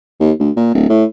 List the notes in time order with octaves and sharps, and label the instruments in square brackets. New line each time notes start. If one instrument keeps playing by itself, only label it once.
[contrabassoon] D#2
D2
A#2
D1
A2